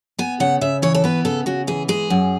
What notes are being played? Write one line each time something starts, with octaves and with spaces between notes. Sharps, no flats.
B3 G#5
C#3 F#5
C#3 E5
E3 C#5
A4
B3 B4
C#3 A4
C#3 F#4
E3 G#4
G#3 G#4
F#2